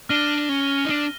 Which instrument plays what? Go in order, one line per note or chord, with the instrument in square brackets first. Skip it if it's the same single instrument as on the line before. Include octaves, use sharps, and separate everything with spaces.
[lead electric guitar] D4 [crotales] F6 A#6 D#7 G7
[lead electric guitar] C#4
D#4
D4